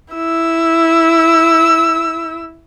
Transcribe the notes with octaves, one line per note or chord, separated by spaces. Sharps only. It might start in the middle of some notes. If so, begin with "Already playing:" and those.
E4 E6